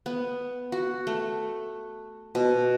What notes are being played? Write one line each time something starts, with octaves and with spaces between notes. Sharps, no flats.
B3
F#4
A3
B2